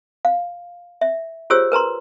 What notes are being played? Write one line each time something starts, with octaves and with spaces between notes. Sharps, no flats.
F5
E5
F4 G4 G#4 C5 C#5 E6
A#4 B4 A#5 C6